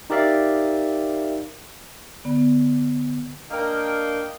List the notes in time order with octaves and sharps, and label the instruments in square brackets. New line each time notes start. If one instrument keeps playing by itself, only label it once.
[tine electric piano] D#4 G4 A#4 D5 E5 F5
[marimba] D3 B3
[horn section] A#3 D4 A#4 D#5 G5